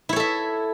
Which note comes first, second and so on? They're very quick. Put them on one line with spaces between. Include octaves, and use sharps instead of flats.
E4 C#5 A4 E5